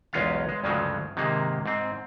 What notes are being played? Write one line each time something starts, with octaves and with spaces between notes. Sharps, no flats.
B1 E2 G#3 C#4 F4 F5
G#3
D2 G2 C#3 F3 F#3 G#3
G#2 C3 D#3 G#3 A#3
G#2 C4